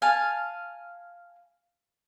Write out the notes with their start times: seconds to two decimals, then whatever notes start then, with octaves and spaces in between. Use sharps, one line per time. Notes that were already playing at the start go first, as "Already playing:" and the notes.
0.02 F5 G#5 A5